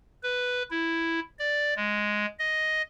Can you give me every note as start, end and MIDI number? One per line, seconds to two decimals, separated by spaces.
0.23 0.63 71
0.71 1.20 64
1.39 1.74 74
1.76 2.26 56
2.39 2.82 75